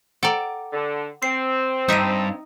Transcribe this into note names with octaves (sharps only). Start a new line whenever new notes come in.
A4 D5 F#5 G5 A#5
D3
C4 C7
G2 D#4 E5 D#6 D7 D#7